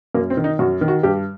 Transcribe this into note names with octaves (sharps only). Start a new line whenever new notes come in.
F#2 A#3
C4
D#3
D#4
F#2 F#4
D#3
F#4
G2 G4